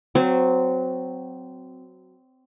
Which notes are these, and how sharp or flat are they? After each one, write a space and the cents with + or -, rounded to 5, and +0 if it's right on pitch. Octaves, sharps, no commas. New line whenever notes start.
F#3 +0 C4 -20